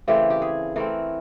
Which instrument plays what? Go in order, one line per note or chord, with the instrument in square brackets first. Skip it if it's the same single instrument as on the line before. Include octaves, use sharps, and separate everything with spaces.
[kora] C#3 E3 A3 C4 G4
G4
G#4
E3 A3 C4 A#4